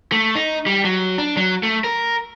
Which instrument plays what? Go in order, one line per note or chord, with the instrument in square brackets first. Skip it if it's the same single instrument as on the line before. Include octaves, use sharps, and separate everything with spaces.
[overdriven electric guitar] A3
D#4
G3
F#3
D4
F#3
A3
A#4